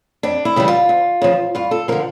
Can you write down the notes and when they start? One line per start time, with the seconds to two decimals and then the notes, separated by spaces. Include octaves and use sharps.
0.23 F2 D4
0.45 E4
0.56 C#3 E3 G3
0.68 F4
0.89 D2
1.22 C#3 F3
1.55 G2 F4
1.71 A4
1.88 F3 A#4
1.92 D3